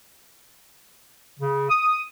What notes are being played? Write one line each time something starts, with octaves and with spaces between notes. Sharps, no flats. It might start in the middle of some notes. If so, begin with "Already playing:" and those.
C#3
D#6